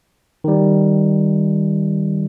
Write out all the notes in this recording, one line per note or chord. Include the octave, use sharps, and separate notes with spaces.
D#3 G3